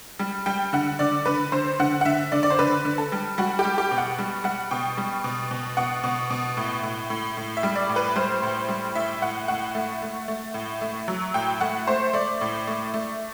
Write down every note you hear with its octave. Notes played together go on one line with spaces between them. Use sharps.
G3
G3 G5
D3 F#5
D3 D5
D3 B4
D3 C5
D3 F#5
F#5
D3 E5
D3 D5
D5
C5
D3 B4
D3
A4
G3
G3 F#4
G4
G3
G4
B2
F#5
G3
G3 F#5
B2 G5
G3
B2
B2
B2 F#5
B2
B2
A2
A2
A2
A2
E5
G3
D5
A2
B4
G3 C5
A2
G3
A2 E5
A2 F#5
A2 F#5
A3
A3
A3
A2
A3
F#3
A2 G5
A3 F#5
A3 C5
A3 D5
A2
A3
A3